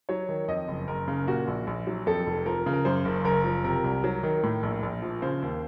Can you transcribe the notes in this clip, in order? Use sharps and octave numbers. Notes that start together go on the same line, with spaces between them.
F#3 C#5
D#3
F2 D#5
F#1
F#1 A#4
C#3
A#2 F#4
A#1
A#1
F#3
F2 A4
F1
F3 A#4
C#3
A#4
F#2 C5
F#1
F#1 A#4
F3
C3 A#4
C2
F#3
D#3
A2
A#1
A#1
F3
C#3 C5
D#2